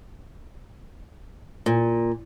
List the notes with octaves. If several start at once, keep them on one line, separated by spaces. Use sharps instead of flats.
A#2